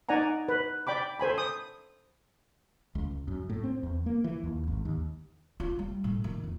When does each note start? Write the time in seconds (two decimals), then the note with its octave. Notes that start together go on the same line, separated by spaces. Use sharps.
0.09 D#4 D5 F#5 G#5 A#5
0.49 B4
0.87 D5 G5 B5 D6
1.19 A4 C5 G#5 B5
1.38 D#6
2.95 C#2
3.28 F#2
3.50 A2
3.64 C4
3.83 E2
4.06 A#3
4.24 E3
4.44 D#2
4.67 G#1
4.85 D#2
5.60 F4
5.79 G3
6.04 A2
6.24 D#3
6.44 F2